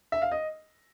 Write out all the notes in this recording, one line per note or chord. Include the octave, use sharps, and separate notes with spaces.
E5
F5
D#5